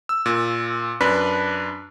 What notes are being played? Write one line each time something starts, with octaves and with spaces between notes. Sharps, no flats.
E6
A#2
F#2 D4 B4 B5